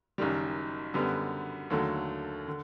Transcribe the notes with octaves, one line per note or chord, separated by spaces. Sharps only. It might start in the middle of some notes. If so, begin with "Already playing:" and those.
F#1 F#2 D#3 G3
F#2 D3 G3 B3
D#2 D3 F#3 A3
D3